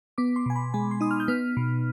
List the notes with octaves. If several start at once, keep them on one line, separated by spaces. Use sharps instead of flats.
B3 D6
C6
B2 G#5
B5
G#3 G#5
C6
D#4 D#6
F6
G6
B3 F6
B2